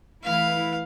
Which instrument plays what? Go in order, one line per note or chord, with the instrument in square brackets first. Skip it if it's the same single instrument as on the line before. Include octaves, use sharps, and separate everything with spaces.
[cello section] E3 A3 E4 B4 [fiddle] F5